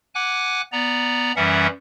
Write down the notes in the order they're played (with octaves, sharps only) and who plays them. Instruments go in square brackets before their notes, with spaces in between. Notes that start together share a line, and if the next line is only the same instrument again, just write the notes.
[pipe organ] F#5 G#5 D6 F#6
B3 D5 A#5
F#2 E3 G3 C#4 E5 F#5